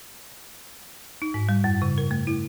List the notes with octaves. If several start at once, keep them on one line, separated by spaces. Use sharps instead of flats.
D#4
G#2
G3
F#2
C#3
A#4
A3
E4